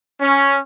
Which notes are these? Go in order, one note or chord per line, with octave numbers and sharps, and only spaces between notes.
C#4